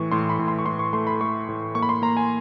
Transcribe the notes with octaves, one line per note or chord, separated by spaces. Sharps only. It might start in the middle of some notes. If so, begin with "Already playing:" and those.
Already playing: A2 E3 C#6
A2 C6
B5
A2
C6
C#6
A2 C6
C#6
A3 C6
B5
A3 C#6
A2
A#3 C#6
B5
C6
A#3 A#5
G#5